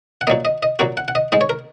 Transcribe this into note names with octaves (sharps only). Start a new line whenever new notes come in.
F#5
A#2 F#3 A#3 D#5
D#5
D#5
A#2 F#3 A#3 F#4
F#5
F#5
D#5
G#2 G#3 D#5
C#5
A#4